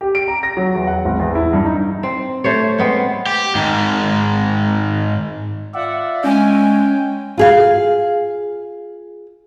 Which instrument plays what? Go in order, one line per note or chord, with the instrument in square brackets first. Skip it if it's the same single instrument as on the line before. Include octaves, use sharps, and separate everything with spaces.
[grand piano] G4
D7
A#5
A#6
F#3
E2
F#5
G#1
E2
E4
G2
D#4
[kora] C4
A3 C5 C#5
G#3 B3 C4
[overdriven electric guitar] G4
G#2 D#3
[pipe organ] F4 D5 E5 [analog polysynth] F#5
[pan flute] G#3 [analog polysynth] C#4 G#5 [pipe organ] G5
[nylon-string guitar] F4 G#4 F5